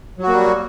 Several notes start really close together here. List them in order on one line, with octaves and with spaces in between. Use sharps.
F#3 F#4 A#3 G3